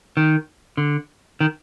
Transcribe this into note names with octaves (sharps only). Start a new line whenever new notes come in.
D#3
D3
D#3